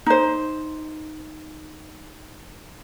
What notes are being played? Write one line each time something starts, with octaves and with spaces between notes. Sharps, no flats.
D#4 C5